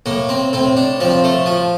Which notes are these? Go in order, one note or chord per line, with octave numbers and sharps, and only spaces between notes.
A2 A#3
C4
A2 C4
D4
F3 C4
A3
F3